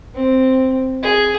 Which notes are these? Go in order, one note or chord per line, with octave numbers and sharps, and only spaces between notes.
C4
G#4